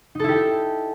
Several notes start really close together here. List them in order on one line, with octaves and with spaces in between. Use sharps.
D#4 A4 E4 G4